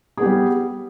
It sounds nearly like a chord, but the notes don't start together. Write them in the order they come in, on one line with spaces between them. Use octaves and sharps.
G#4 B3 G4 G3